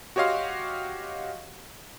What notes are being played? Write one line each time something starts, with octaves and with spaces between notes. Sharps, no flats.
F#4 G4 C#5 D#5 F5 C6